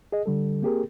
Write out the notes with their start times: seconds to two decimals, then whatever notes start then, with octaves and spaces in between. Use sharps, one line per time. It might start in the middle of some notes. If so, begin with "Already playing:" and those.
0.12 G#4 D#5
0.26 D3 G3 A4
0.62 A#3 C4 G4 G#4 A#4